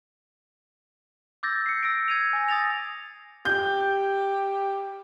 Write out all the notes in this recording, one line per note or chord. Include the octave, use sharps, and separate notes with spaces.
D6 E6 G6 A6 A#6
C7 C#7
E6 A#6 D7
G#6 D#7 F7
G#5 A#6
D#6 A6 A#6 F7
G4 G6